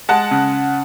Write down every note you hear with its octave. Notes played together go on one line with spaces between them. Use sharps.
G#3 F#5 A5
C#3